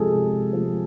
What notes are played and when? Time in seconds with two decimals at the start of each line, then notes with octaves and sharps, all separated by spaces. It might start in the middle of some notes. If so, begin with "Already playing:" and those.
Already playing: C3 F3 G#3 G#4 A4
0.12 C3
0.53 F3 G#3